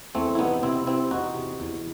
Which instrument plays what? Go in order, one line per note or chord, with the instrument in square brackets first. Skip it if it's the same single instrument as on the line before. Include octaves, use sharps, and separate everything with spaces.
[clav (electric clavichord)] E2 A3 C4
E4
C3 B3 D#4
C3 C4 E4
C3 C4 E4
E2 D#4 F#4
C3
E2